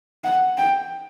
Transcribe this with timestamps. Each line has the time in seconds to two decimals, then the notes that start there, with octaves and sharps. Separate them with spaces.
0.24 F#5
0.58 G5